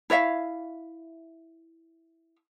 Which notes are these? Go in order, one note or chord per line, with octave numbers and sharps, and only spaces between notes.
E4 C#5 E5 F5